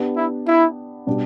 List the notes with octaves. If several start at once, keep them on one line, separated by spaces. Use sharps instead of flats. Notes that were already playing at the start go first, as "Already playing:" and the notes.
Already playing: B3 D4 G4
E4
E4
B2 G3 D4 G4